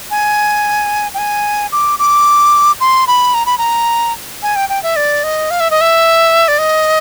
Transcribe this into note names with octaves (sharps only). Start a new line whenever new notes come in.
G#5
G5
G#5
D6
D6
C6
B5
A#5
B5
A#5
G#5
G5
G5
E5
D5
D#5
F5
E5
D#5
E5
D5
D#5